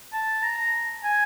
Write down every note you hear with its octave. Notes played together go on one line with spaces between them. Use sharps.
A5
A#5
G#5